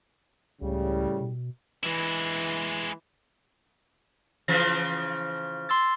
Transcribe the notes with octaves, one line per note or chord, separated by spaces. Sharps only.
C#2 A2 C#3 G3
B2
E3 G#3 E4
C#3 E3 F3 A#6
C6 E6 A6